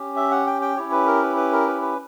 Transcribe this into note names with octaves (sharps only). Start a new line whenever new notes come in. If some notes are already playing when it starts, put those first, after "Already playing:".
Already playing: C#4 G4
E5
F#5
G5
G5
C#4 E4 G4 C#5
B4
A#4
B4
B4
A#4
B4
B4